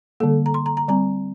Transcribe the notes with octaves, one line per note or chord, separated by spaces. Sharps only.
D3 G3 A#3 A4
A#5
C6
A#5
A#5
G3 C4 A#5